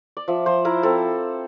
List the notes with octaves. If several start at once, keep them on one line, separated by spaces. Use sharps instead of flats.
D5
F3 E5
F3 C5
E4 A#4
C4 A4